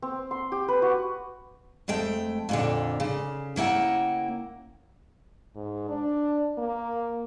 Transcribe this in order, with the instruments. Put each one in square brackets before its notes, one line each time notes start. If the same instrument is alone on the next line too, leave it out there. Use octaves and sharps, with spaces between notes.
[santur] C4
C6
G4
B4
F#4
[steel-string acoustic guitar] F2 G#3 A3 G5
F2 A#2 D3
C#3
C#3 A#3 E4 F#5 G5
[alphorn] G#2
D4
A#3